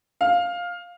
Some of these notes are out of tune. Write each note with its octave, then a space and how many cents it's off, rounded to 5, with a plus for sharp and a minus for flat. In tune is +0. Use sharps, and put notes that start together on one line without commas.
F5 +10